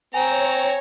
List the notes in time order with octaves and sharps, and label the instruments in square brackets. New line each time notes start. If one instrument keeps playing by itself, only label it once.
[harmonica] C4 [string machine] C#5 [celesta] G#5 [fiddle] A#5